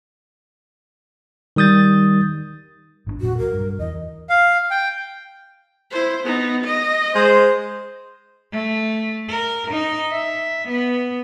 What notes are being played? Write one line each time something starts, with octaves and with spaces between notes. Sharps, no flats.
D#3 G3 D#6 G6 A6
G#1 D#3 D4
E1 A#2 F#3 F#4
C2 A#4
G2
E2 E3 D#5
F5
G5
E4 C5
B3 D#4
D#5
G#3 G#4 C5
A3
A#4
D#4
E5
B3